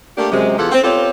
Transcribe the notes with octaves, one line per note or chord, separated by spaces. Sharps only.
A3 A#3 D4 G4
F#2 C3 G#3
E2 F4 G4 A4 F#5
C4
B3 C4 F4 G4 A4 C#5